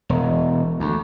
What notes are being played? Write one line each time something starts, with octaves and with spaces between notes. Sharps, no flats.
E1
D2